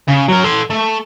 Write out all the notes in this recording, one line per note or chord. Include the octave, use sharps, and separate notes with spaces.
C#3
F#3 A#4
A4 C6
A3